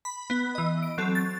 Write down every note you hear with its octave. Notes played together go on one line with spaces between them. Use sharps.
B5
B3
E3 D#5
D7
F#3 C4 A4
A6